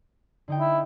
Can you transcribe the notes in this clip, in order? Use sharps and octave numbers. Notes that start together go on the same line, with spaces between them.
D3 D#4 G5
E4